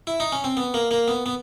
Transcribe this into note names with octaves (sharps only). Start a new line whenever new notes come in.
E4
D#4
C#4
C4
B3
A#3
A#3
B3
B3